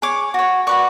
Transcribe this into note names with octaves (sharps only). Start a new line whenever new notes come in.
G#4 C#5 D6
F#4 C#5
F#4 B4 D5 C#6